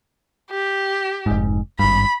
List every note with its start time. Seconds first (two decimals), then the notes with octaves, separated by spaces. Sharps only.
0.50 G4
1.26 F1 G#2
1.79 G#1 G2 B5